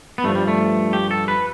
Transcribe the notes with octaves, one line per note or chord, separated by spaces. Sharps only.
B3
G2 F3 A3
G3
A3
G4
A4
B4